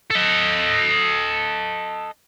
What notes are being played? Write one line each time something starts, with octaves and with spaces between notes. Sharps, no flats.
A4 D#5